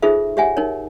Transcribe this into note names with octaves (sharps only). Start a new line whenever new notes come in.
D#4 F4 G#4 A4 C5 E5
G4 C#5 E5 F#5 G#5
D#4 A#4 C#5